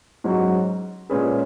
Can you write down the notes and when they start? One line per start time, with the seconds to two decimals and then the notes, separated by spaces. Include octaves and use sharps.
0.24 G#2 F#3 C#4 F#4
1.10 A#2 G#3 C#4 G#4 B4